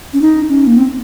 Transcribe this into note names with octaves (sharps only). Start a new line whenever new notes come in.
C#4
D#4
C#4
A#3
C4